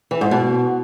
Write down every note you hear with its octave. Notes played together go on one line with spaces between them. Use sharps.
E3
G#2
B2